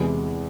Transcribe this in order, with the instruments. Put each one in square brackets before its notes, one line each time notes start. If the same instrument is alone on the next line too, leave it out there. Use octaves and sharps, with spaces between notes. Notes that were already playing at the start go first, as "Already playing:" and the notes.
Already playing: [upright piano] E2 C3 E3 G#3